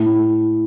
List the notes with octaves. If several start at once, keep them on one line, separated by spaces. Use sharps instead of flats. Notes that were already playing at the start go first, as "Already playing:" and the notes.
Already playing: A2